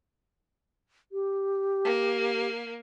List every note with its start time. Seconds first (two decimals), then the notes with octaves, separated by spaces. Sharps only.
1.12 G4
1.85 A#3